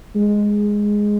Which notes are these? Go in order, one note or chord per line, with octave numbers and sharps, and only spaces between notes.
G#3